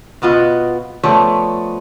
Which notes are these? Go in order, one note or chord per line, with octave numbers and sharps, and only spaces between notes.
B2 B3 F4 D#5
F3 A3 B3 C#5 D5